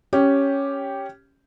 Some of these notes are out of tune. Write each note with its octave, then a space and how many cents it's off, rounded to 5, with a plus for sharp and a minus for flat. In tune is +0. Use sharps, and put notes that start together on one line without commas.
C#4 +0 G4 +0